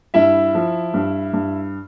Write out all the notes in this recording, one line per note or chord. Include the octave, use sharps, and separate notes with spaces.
G2 E4 E5
F3
G2
G2